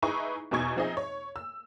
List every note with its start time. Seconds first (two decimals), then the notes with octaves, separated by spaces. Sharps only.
0.02 D#4 E4 G#4 B4 A#5 C#6
0.51 E2 B2 D#4 C#6 G#6
0.76 F3 C4 D#4 G#4 D#5 E5
0.97 C#5
1.36 E6